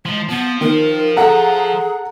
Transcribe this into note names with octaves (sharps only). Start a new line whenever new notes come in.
F3 G#3
F3 B3
D#3 A#4
G#4 A4 F#5 A#5